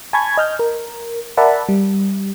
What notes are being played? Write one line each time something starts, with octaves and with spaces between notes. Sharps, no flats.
G#5 A5 B5 C#6 G#6
D#5 F6 G6
A#4
A#4 D5 E5 F#5 A5 B5
G3